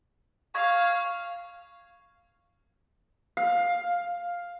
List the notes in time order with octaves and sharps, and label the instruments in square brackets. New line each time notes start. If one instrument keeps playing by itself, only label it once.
[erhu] F5 [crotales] C#6 G#6
[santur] F5